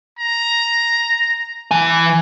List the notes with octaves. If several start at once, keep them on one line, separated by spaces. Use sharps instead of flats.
A#5
E3 G#5